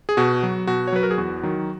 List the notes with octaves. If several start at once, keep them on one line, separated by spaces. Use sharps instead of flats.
G#4
B2 F#4
F#3
B2 F#4
C#5
F#3 B4
A#4
G#4
E2 F#4
D#3 F#3